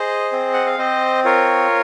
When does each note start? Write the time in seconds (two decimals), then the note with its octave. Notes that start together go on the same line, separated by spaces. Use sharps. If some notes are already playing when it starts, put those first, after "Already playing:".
Already playing: G#4 C5 D#5
0.32 C4
0.53 F#5
0.66 F5
0.78 C4 C5 D#5
1.25 F4 A#4 C#5